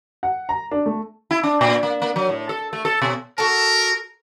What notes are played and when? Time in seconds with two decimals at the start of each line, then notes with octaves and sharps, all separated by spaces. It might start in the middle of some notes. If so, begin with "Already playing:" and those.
0.23 F#5
0.49 A#5
0.71 D4
0.86 A3
1.31 E4
1.43 D4
1.61 A#2
1.83 A#3
2.02 A#3
2.16 F#3
2.29 A2
2.49 A4
2.73 A3
2.85 A4
3.02 B2
3.38 F#4 A4 A#4 A5